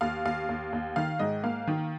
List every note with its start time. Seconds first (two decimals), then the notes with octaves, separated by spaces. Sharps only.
0.01 D#2 F5
0.25 D#2 F5
0.49 D#2
0.73 D#2
0.96 D#3 F5
1.19 G#2 D#5
1.43 A#3 F5
1.67 D#3